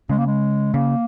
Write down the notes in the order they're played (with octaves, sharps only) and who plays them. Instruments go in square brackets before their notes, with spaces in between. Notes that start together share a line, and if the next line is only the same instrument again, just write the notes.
[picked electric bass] C#3 [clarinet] G#3
[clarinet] A#3
G#3
[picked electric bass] C#3 [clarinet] A#3